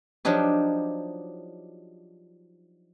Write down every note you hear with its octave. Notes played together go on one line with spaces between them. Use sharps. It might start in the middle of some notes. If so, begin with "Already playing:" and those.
F3 F#3 D4 D#4 G4